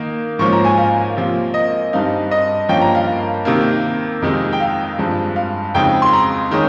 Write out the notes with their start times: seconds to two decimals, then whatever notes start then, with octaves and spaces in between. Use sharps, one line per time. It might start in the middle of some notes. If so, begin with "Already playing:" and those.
Already playing: D#3 A#3 D#4
0.39 G#2 F3 A#3 C#4 C#6
0.52 A#5
0.65 G#5
0.77 F5
1.17 C3 F3 A#3
1.54 D#5
1.93 G2 G3 C4 D#4 F5
2.31 D#5
2.69 G2 F3 A#3 C#4 G5
2.81 A#5
2.95 F5
3.45 C3 D#3 A#3
4.22 F2 C3 D#3 G#3 D#4
4.53 G5
4.60 F5
4.98 G2 F3 G#3 C4
5.36 F5
5.75 F2 C#3 G#3 C4 D#4 G5
6.02 C6
6.13 A#5
6.51 D#3 G#3 C#4